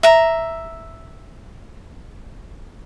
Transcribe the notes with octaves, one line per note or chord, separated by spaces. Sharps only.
E5 A#5